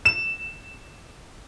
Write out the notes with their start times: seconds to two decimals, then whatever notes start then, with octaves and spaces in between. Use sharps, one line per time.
0.05 E7